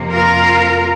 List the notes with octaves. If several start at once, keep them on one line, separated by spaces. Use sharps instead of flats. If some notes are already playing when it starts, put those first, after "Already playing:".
Already playing: F2 C3 A#3
F4 A#4